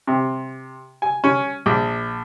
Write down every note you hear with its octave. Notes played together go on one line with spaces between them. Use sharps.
C3
G#5
C#4
A#1